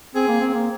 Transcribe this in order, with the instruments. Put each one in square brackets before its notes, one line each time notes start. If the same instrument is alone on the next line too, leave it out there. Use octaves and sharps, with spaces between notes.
[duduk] C4 [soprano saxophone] G#4
[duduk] A#3
C4
A#3